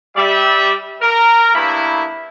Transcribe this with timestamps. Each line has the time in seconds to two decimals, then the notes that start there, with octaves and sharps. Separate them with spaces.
0.16 G3 D5 E5
1.01 A#4
1.54 G2 A#3 B3 E4